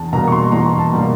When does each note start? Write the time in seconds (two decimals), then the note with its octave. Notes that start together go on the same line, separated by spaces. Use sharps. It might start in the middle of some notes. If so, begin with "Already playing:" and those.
Already playing: E2 A5
0.13 B2 G3 A#3 A#5
0.28 C#6
0.32 C6
0.52 E2 A#5
0.79 A5
0.93 B2 G3 A#3